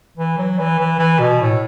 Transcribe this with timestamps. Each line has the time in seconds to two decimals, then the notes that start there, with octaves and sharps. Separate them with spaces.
0.18 E3
0.38 F#3
0.58 E3
0.79 E3
0.99 E3
1.19 B2
1.41 A2